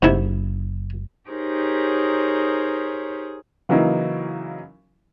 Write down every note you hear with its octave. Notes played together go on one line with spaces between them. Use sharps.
F#1 G#2 C3 E4
D#4 G4 G#4 A#4 C5 C#5
C#3 E3 F#3 A#3 D#4 E4